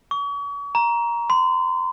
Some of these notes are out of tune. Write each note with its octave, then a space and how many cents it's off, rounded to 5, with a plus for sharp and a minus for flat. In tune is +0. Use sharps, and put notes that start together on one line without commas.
C#6 +40
A#5 +15
C6 -30